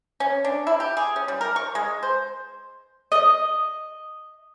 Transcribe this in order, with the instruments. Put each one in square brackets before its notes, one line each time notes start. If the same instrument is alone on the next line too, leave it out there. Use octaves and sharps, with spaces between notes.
[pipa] C#4
D4
E4
G4
G#4
C#4
G3
A#4
C#6
G#3
C5
[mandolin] D#5